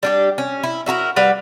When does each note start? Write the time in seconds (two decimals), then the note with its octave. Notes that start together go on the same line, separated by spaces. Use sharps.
0.03 G3 D4 G4
0.38 C#4
0.63 E4
0.86 E4 F#4 A4 A#4
1.16 G3 F#4 B4 F5